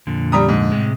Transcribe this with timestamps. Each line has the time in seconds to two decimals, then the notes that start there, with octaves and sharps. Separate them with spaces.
0.07 F2 A#2 D3
0.32 G3 A#5 D#6
0.49 G#2
0.72 A2 C3 G#3